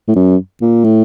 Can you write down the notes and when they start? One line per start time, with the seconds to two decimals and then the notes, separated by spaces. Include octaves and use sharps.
0.08 A2
0.16 F#2
0.61 A#2
0.84 A2